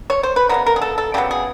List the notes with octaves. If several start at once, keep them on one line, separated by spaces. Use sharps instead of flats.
C#5
C5
B4
C#3 F#3 B3 A#4
A#4
G#4
A4
A4
C#3 F#3 B3 G4
G#4